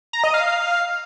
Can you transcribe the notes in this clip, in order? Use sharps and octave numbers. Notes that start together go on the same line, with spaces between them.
A#5
D#5
F5